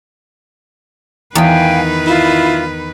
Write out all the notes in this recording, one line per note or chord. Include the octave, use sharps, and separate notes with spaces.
E2 D#3 B4 F5 G5 G#5 B5
E4 F4